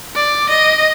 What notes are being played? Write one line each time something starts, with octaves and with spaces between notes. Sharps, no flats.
D5
D#5